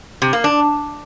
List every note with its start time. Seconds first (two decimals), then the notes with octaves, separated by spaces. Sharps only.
0.22 C3
0.33 A#3
0.44 D4